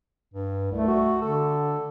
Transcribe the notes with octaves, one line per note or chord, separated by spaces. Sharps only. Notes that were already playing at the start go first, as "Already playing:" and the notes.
G2
C2 A3
F#4
D3 A4